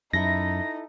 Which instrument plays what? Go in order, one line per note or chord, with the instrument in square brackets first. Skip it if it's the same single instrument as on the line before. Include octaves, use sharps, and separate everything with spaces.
[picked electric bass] F#2 [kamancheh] D#4 [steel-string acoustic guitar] E4 A4 E5 [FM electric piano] A#6